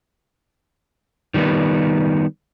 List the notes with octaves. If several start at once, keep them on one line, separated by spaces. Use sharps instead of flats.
D#3 G3 A#3 B3